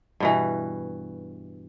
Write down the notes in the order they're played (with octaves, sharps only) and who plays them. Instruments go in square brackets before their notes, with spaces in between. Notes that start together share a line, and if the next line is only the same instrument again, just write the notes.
[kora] G2 B2 E3